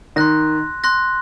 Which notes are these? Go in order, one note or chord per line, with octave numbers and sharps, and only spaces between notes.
D#3 C6 F#6 A#6
C6 F#6 A#6